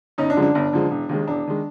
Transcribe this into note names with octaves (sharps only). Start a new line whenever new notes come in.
G1 C#4 D#4
D4
F#2 D3 F3 G#3
D4
G1
F#2 D3 F3 G#3
E1
D#2 D#3 G#3
E1 D4
D#3 G#3